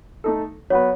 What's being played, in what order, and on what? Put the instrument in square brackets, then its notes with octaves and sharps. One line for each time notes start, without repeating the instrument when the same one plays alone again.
[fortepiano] A3 D#4 A4
[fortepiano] F#3 B3 F#4 B4 [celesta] C#5